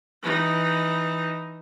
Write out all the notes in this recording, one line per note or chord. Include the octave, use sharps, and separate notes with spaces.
E3 D#4